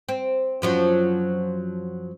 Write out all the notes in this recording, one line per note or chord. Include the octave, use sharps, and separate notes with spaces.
C4
F#2 F3 F#3